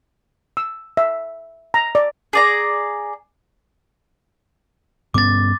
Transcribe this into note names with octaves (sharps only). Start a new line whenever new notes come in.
E6
E5
A#5
D5
G#4 D5 A#5
G2 B3 C#4 D6 A6